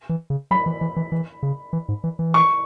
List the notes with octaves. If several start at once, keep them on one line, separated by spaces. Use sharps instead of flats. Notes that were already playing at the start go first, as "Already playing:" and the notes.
E3
C#3
F#3 B5
E3
E3
E3
E3
C#3
E3
G#2
E3
E3
C#6